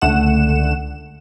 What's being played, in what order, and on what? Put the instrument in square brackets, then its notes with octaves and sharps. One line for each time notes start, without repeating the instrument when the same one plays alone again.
[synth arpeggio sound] C#2 D3 A3 F#5 E7